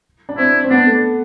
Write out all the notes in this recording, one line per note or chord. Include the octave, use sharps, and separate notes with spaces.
D4
C4 E4
C4
B3 D4
A3